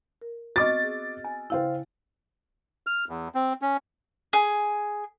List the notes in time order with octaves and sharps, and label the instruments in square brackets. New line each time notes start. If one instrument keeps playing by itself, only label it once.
[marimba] A#4
[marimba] B3 C4 [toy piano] F#4 D#5 [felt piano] C#6 D6 F6 [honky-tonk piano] A6
[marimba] G#4
[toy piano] G#5
[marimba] C#3 E4 [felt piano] C5 F5 G5
[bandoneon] F6
E2
C4
C#4
[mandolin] G#4